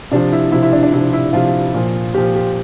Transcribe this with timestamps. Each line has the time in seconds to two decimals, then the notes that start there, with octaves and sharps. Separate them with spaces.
0.12 C3 F3 D4
0.33 E4
0.52 C3 F3 E4
0.63 E4
0.73 D4
0.83 D4
0.93 C3 F3 E4
1.13 E4
1.33 C3 F3 F4
1.74 A#2 F3
2.14 A#2 F3 G4
2.35 G4